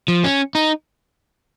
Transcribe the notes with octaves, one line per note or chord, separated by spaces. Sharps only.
F3
C#4
D#4